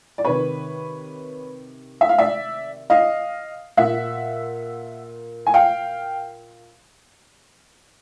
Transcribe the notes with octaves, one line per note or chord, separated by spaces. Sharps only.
D5
C3 D#3 B4 C#5
E5
F5
D5 E5
D#5 F5
A#2 E5 F#5
G#5
F5 G5